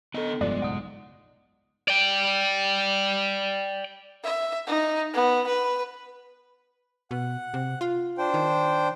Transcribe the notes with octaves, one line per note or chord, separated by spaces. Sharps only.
D3 B3 A4 D#5
F1 G2 F3 G#3 D5
F#1 B1 G#2 F#5 D#6
D5 G5
E5
D#4
B3
B4
B2 F#5
C3
F4
D4 C5 G5
D#3